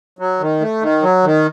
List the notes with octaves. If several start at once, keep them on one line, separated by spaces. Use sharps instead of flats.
F#3
D#3
A3
D#3
F#3
D#3